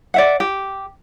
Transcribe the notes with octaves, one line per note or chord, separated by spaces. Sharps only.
D5 E5 F#5
G4